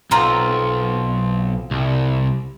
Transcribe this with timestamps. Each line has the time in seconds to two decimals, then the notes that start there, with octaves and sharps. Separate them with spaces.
0.11 B1 C4 F4 A#5
1.71 C2